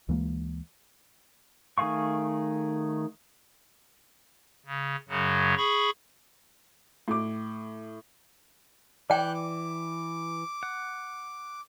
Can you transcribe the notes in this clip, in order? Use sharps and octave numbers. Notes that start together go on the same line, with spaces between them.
D2 E3 G#3 A#3
D#3 A3 G#4 F5 C#6
C#3
F#2 C#3 F#3
G#4 B5 C#6
A2 D6
E3 D5 G5 D6 F#6 G6
D6
F#5